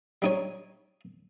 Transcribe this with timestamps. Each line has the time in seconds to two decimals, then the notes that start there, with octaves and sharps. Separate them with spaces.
0.22 G3 D#4 C#5